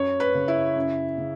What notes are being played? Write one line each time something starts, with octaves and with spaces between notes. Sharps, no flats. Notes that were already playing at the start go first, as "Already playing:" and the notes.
Already playing: F#2 C#5
B4
C#3
E4
F#2
C#3